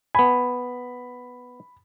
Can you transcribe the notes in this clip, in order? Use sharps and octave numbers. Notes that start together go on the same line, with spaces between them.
B3 G#5 B5